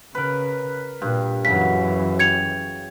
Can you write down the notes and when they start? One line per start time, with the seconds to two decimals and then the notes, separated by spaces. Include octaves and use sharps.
0.15 C#3 A#4 B4
1.02 G2 A#2
1.45 F#2 C#3 E3 F#3 B6
2.19 G5 G#6 C#7 F7